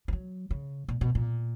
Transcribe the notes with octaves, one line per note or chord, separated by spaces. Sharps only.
E3
F#3
C#3
A#2
B2
A#2